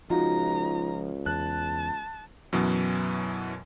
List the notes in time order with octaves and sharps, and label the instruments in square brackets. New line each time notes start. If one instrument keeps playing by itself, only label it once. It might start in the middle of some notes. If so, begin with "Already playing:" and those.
[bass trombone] C#2 [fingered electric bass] F3 [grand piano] D#4 F4 F#4 [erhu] A#5
[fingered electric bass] E2 [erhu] A5 [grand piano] F#6
[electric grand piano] F#2 B2 E3 F#3 B3